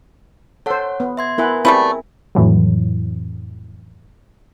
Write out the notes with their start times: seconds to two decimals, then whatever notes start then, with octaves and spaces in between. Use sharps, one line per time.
0.66 A4 C5 C#5 F#5
1.00 B3
1.17 E5 C6 G#6
1.38 B3 E4 A#4 B4 E5 G#5
1.65 G3 A3 C4 E4 G#4 B4
2.35 F2 A2 E3 F#3